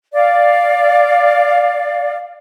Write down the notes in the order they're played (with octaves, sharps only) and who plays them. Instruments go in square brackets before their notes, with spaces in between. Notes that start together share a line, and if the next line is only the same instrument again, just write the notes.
[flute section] D5 F5